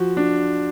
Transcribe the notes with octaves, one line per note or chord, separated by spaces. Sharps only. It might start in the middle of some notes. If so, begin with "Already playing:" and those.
Already playing: F3 F#4
D4